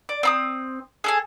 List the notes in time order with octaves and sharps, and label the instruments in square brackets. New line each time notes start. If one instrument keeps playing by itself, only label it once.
[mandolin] D5
C4 A#5 D#6
G#4 A4 G#5